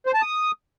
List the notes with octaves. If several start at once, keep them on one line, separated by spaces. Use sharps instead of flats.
C5
A5
D#6